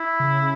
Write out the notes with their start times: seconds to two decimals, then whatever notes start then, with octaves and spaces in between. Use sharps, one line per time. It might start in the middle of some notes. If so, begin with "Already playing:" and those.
Already playing: E4
0.20 C#3